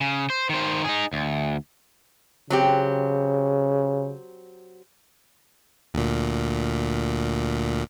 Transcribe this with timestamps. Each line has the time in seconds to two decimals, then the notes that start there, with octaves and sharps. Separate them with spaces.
0.01 C#3
0.30 C5
0.49 D#3 C5
0.84 D#4 G#4
1.13 D2
2.50 C#3 F#3 C4 G4
5.94 D2 A#2